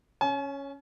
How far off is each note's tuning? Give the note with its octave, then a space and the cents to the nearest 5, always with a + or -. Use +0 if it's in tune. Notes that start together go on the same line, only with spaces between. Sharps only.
C#4 +0 G#5 +40